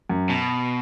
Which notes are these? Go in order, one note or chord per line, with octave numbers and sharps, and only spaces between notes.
F#2
B2